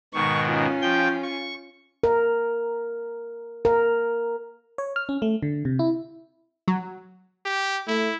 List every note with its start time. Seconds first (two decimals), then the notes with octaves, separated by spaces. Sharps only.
0.14 G#2 B2 D#3 C#6
0.50 C#4 F4
0.82 F3 G5 G6
1.23 C#6
2.04 A#4
3.65 A#4
4.78 C#5
4.96 F6
5.09 C#4
5.22 A3
5.42 D3
5.65 C3
5.79 E4
6.68 F#3
7.46 G4
7.88 A3 E4